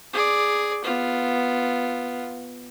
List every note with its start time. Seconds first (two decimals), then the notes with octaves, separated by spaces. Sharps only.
0.13 G#4 D5
0.84 B3 F4